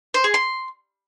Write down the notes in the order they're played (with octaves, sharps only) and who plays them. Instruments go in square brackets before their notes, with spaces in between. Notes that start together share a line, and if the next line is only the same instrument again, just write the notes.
[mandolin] C5
G#4
C6